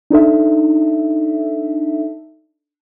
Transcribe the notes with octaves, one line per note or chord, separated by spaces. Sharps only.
D4 D#4 A4 E5